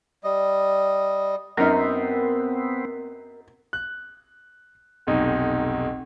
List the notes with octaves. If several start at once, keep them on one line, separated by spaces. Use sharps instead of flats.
G3 D#5
F#2 B3 C4 D#4 A#4
F#6
F1 B1 D#4